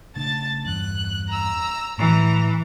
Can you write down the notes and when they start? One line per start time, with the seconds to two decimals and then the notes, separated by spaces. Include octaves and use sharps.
0.16 C#3 A3 D4 A5 A6
0.66 E2 G2 F#6
1.29 A#5 E6
1.98 A2 E3 A#5